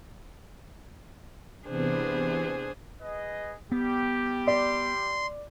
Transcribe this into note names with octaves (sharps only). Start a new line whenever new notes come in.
C3 E3 B3 D4 G#4 C5
G#4 B4 D#5
G3 B3 G4
D5 C6